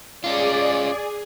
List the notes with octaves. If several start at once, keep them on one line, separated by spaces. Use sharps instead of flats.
C#4 F4 G#4 D5